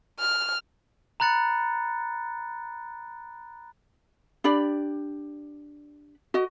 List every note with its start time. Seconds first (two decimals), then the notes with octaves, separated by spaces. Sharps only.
0.20 F6
1.20 A#5 B5 F#6 A6 C#7
4.44 D4 G4 D5 B5
6.34 F#4 D#5